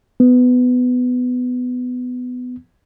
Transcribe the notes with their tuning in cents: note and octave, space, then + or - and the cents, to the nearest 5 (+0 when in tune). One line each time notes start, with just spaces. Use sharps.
B3 +15